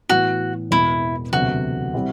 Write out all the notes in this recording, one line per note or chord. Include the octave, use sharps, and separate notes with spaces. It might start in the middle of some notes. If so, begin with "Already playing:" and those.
A2 E3 B3 F#4
E1 E2 B2 E4
E1 D2 C3 F#3 B3 F#4
C3 G3 C4 E4